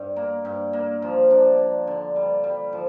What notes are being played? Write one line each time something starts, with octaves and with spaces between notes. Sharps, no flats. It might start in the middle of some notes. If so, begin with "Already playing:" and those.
Already playing: G2
A#3
G2
A#3
F3
D4
D4
D3
G3
G3
F3